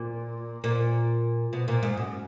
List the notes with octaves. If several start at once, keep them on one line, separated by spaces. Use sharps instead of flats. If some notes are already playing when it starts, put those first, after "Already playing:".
Already playing: A#2
A#2
B2
A#2
G#2
F#2